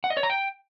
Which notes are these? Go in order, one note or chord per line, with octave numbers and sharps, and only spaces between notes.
F#5
D#5
C#5
A#5
G5